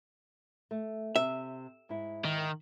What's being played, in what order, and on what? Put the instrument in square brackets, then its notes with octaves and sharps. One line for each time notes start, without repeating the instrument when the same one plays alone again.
[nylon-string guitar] A3
[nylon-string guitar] C3 [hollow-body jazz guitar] E5
[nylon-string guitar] G#2 E4
[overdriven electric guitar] D#3